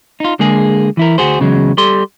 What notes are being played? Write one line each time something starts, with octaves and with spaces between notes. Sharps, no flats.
D#4 F4
D3 G#3 A#3 G#4
E3 E4 A#4
D2 G#2 F#4 G#4 C5
E2 C#3 F#3 G#3
G3 G4 A4 C6